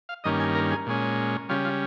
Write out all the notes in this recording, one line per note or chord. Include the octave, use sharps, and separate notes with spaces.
F5
G2 D#3 A#3 C#4 D#5
G#5
A#4
G#4
A#2 G#3 C#4
C#3 G3 C#4 F4
F4